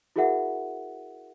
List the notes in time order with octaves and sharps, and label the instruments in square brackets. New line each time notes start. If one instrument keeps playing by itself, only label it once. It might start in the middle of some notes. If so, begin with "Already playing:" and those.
[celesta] E4 F#4 G#4 A#4 E5 F#5